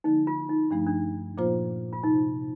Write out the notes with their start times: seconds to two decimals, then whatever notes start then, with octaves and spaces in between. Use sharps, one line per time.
0.04 D3 F3 A#3 D#4
0.27 F4
0.49 D#4
0.71 G2 F3 A3 D4 D#4
0.87 D4
1.38 A#2 F3 A#3 F4 C5
1.93 F4
2.03 C3 D#4